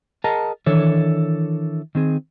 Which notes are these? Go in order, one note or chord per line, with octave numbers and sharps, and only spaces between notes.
G#4 A#4 D#5 F#5 A5 A#5
D#3 E3 D4 A4 C#5
D#3 C4 G#4